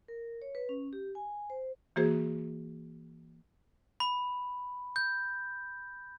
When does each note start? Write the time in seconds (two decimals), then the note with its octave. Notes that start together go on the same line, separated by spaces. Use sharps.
0.08 A#4
0.42 C#5
0.55 B4
0.69 C#4
0.93 G4
1.15 G#5
1.50 C5
1.96 E3 A#3 F#4 G#4 C5
4.00 B5
4.96 G6